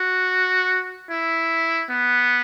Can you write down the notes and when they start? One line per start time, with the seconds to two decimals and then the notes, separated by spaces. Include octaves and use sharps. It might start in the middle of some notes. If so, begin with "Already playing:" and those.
Already playing: F#4
1.10 E4
1.90 B3